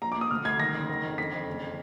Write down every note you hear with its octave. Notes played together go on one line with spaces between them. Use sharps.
A#1 A#5
D6
A#2 D#6
D2 F6
D2 G#6
D#3 A#6
F#1
D#3
F2
D3 B6
F2
F#1